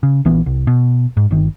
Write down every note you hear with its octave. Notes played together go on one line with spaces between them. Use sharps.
C#3
A#1 E3 B3
C2
B2
G#2
G1 D#3